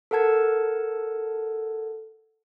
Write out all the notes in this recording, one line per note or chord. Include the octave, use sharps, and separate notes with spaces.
A4 A#4 F#5 A5 G#6